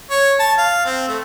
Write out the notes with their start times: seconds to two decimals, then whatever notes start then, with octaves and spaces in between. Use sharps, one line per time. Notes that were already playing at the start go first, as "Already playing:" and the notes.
0.11 C#5
0.39 A5
0.58 F5
0.86 C4
1.08 A3